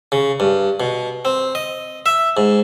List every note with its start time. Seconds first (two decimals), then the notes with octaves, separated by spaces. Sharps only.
0.12 C#3
0.40 G2
0.80 B2
1.25 C4
1.55 D#5
2.06 E5
2.37 G#2